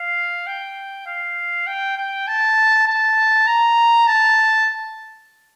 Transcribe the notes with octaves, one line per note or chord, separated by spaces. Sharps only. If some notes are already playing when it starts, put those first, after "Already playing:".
Already playing: F5
G5
F5
G5
G5
A5
A5
A#5
A5